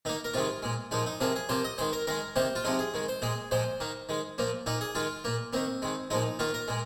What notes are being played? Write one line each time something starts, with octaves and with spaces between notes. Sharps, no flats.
D#3 A#3 D#4
A#4
C3 D#3 G#3 F4
A#2 G#3
A#2 F3 G#3 D#4
D#4
C3 F3 A#3 G#4
G#4
C3 F3 A#3 C5
D#5
D#3 G#3 C5
A#4
D#3 G#3 A#4
C3 D#3 A#3 C5
F4
C3 F3 G#3 D#4
G#4
D#3 G#3
C5
A#2 G#3 G#4
A#2 F3 G#3 C5
D#3 A#3
D#3 G#3
A#2 F3 A#3
A#2 A#3 D#4
G#4
D#3 G#3 F4
A#2 A#3
D#3 A#3 C4
D#3 G#3
A#2 F3 G#3 D#4
D#3 A#3 F4
A#4
A#2 G#3